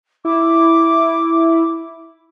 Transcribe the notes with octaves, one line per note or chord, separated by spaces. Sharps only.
E4 D6